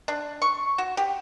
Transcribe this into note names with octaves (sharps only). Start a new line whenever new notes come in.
D4
C#6
F#4
G4